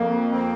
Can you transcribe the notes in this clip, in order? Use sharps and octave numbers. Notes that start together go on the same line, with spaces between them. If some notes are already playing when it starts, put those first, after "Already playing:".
Already playing: F2 A#3
C4